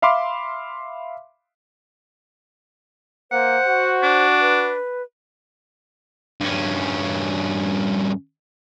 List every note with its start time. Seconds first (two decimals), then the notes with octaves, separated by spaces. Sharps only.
0.02 E5 F5 B5 C6 D6
3.32 A#3 C5 F#5
3.67 F#4
4.03 D4
4.41 B4
6.40 G2 C#4